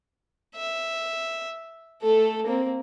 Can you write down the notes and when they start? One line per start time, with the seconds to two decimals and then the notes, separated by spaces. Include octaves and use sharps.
0.55 E5
2.02 A3 A4
2.46 A#3 C4